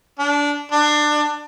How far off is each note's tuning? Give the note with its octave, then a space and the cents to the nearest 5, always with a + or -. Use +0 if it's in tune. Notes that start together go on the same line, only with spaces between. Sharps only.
D4 -20
D4 +25